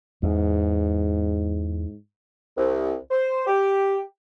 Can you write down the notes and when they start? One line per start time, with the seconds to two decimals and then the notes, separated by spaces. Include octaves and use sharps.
0.23 E2 G#2
2.57 C2
3.11 C5
3.47 G4